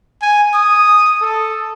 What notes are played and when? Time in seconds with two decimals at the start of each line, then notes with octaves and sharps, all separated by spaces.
0.22 G#5
0.54 D#6
1.22 A4